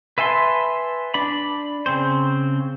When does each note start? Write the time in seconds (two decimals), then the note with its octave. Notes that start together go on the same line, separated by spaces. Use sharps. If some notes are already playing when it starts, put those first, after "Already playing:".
0.18 B4 E5 G#5 A5 C6
1.14 D4 D5 B5
1.86 C#3 C4 C5